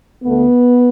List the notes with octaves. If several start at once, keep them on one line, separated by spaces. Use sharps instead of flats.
D2 D3 A3 B3